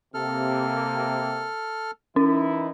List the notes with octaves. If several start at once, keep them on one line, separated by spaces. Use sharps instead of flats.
C3 A#3 A4 F6
E3 C#4 D#4 E4